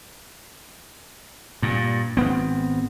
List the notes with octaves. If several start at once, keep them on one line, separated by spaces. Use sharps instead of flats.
G2 A#2
G#1 B3 C4